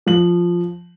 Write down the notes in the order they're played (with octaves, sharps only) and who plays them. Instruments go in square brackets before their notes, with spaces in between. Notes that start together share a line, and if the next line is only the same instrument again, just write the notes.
[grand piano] F3 F#7